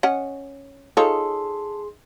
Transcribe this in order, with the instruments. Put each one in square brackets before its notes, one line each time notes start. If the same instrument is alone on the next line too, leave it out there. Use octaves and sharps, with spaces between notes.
[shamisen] C#4 D#5 F#5
[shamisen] D#4 F4 C#5 [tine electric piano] G#4 C6 [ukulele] A4